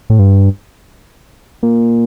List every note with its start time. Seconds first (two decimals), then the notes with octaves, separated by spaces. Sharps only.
0.10 A2
0.19 G2
1.63 A#2